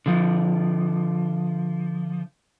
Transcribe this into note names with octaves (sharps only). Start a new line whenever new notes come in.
D3 F3